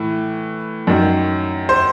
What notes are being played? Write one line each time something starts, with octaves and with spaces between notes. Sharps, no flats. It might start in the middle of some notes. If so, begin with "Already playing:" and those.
Already playing: A2 E3
F#2 D#3
C5